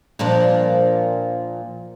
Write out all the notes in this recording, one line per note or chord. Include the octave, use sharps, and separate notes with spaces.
A#2 F3 D4